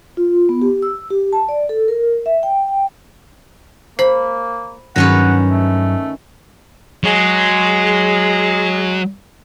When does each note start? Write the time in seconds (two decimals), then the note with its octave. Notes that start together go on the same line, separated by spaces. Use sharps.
0.17 F4
0.49 B3
0.62 G4
0.82 E6
1.10 G4
1.33 A5
1.49 D5
1.69 A4
1.88 A#4
2.26 E5
2.43 G5
2.68 G5
3.99 A#3 C5 B5
4.96 G2 D#3 F#3 C#4 B4 F#5 A#6
5.51 A3
7.04 F#3 G#3